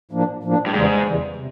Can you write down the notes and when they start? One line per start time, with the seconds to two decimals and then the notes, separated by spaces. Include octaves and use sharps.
0.11 A2 F3 A#3 D4
0.43 A2 F3 A#3 D4
0.66 G2
0.74 E2 G#2 C#3 E3 G3
1.05 E2 C#3 E3 G3
1.36 C3